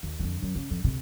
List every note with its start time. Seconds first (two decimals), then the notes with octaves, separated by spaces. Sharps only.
0.03 D#2
0.19 F2 D3
0.42 F#2
0.55 C#3
0.70 F2
0.84 D2 C3